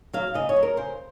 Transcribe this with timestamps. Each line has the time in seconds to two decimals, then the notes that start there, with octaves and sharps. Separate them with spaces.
0.14 F#3 F5
0.34 C#3 D#5
0.49 C#5
0.56 F#3
0.63 A#4
0.77 C#3 C5